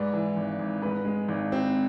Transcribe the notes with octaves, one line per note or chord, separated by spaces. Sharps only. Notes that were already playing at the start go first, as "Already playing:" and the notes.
Already playing: G#2 B4 D5
E3
G#1
G#1
G#2 B4
G#3
G#1
C4